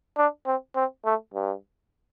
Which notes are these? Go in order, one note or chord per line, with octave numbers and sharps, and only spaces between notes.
D4
C4
C4
A3
G2